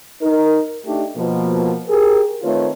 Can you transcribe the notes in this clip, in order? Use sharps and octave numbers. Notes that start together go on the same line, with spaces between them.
D#4 A#4
A3 D4 D#4 G4
B2 F3 A#3
G4 G#4 A#4
D#3 A3 C4 F4 B4 C#5